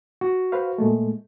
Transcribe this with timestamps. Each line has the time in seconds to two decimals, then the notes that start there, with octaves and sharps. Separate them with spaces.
0.21 F#4
0.52 B4 C5 F5
0.78 A#2 G#3 A3